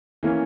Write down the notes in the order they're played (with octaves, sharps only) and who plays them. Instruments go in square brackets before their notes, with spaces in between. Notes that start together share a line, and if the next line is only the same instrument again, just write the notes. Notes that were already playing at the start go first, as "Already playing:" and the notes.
[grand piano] E3 A#3 C#4